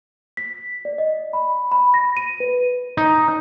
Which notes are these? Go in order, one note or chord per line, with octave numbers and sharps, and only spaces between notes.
B6
D5
D#5
B5
B5
A#6
D#7
B4
D#4